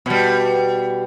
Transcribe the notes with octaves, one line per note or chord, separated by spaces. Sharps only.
B2 G3